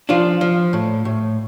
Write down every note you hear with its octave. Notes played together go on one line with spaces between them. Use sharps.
F3 D4 F4
F3
A2
A2